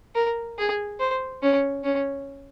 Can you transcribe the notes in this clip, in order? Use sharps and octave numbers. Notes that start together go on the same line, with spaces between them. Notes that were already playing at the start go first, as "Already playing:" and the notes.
A#4
G#4
C5
C#4
C#4